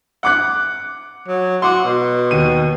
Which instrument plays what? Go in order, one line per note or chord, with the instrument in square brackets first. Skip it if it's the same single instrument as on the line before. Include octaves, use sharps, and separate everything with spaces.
[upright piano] F#5 D6 F#6
[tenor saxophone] F#3
[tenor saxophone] F#4 [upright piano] C6 D6
[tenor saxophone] B2
[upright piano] D#2 D#7